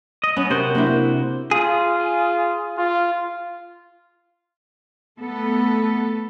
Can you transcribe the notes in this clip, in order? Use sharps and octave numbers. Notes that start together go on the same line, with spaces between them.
D#5
B3 C#4
C3 F#4 A#4 C5
A#3 D4 E4
F4 G#4
F4
A3 B3 A4